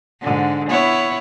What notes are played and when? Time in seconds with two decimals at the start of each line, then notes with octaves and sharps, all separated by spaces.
0.21 G#2 D3
0.69 B3 E4 C#5